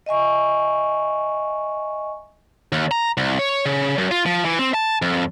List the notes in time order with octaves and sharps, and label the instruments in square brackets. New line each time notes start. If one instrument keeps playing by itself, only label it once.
[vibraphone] D#5 E5 G#5 C#6
[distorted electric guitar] D#2
A#5
C2
C#5
C#3
F#2
F4
F3
E3
C4
A5
F2